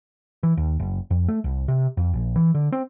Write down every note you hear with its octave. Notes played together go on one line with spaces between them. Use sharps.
E3
D#2
F#1
F2
A3
C2
C3
F2
A#1
E3
D3
C4